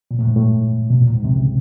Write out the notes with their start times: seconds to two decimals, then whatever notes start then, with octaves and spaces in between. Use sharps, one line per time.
0.11 A#2
0.19 A2
0.27 G#2
0.36 A2
0.90 B2
1.02 A#2
1.13 G#2
1.24 C2 C3
1.35 C#2 C#3